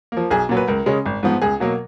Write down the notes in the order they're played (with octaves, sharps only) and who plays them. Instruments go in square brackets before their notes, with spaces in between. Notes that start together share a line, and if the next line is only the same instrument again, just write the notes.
[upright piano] F3 A#3
B1 G#4
A#2 F#3
B4
C#2 A#4
C#3 G#3 C#4
G#1
G#2 F3 B3
C#2 G#4
B2 F#3 A#3